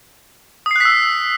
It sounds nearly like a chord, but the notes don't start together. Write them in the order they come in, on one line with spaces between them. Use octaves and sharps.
D#6 C7 F#6 B6 E6